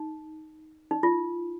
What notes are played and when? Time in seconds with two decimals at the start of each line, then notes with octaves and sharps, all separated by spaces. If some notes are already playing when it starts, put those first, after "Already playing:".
Already playing: D#4
0.91 D#4
1.03 F4